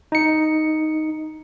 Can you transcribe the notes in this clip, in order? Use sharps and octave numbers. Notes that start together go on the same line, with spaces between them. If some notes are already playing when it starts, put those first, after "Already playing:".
D#4 C#7